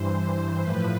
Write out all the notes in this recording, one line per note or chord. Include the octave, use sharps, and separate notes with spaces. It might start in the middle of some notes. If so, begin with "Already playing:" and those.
Already playing: G2 E3 C5
A2 F3 B4